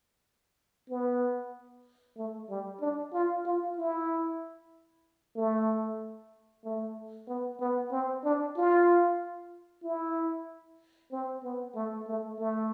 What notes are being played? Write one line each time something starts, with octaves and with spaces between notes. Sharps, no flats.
B3
A3
G3
D4
F4
F4
E4
A3
A3
B3
B3
C4
D4
F4
E4
C4
B3
A3
A3
A3